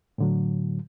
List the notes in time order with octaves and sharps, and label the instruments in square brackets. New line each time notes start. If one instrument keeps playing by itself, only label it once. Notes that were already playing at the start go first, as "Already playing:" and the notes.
[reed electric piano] A2 D3 F#3